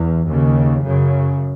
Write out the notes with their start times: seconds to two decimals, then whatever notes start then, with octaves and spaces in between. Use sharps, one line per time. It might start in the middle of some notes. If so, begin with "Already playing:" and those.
Already playing: E2
0.28 D#2 C#3
0.84 F#2 C#3